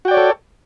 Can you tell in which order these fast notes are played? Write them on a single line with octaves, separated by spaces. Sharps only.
F#4 G5 D5 C#5 A4